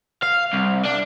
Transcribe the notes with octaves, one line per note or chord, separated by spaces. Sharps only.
F5
C2
D4